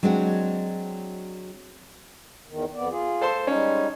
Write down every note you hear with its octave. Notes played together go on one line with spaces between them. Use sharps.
F#3 G#3 C4 D4 F#4
E2 D#3
F2 B3 D5
F4 G#4
A4 C5 C6
G3 G#3 C#4 D#4